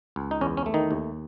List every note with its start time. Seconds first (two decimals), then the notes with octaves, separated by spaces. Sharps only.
0.16 C#2
0.31 D#4
0.41 E2 C#4
0.57 C#4
0.66 A3
0.74 D#3 D#4
0.91 D#2